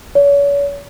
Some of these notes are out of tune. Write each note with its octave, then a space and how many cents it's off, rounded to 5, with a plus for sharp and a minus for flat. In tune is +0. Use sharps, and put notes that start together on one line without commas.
C#5 +40